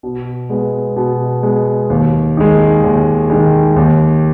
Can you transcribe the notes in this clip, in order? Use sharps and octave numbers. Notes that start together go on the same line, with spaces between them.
B2
G#3 B3
B2
G#3 B3
D#2
D#3 G#3
D#2
D#3 G#3
D#2